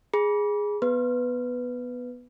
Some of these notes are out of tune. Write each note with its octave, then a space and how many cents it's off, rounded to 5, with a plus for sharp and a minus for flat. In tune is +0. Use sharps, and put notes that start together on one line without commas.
G#4 +0 B5 -35
B3 -5 B4 +5